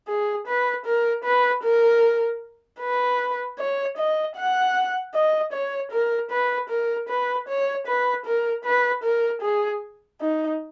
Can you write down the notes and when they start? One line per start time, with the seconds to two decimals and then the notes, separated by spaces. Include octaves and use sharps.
0.08 G#4
0.47 B4
0.86 A#4
1.24 B4
1.64 A#4
2.81 B4
3.58 C#5
3.98 D#5
4.37 F#5
5.14 D#5
5.53 C#5
5.92 A#4
6.31 B4
6.70 A#4
7.09 B4
7.48 C#5
7.87 B4
8.26 A#4
8.65 B4
9.04 A#4
9.42 G#4
10.21 D#4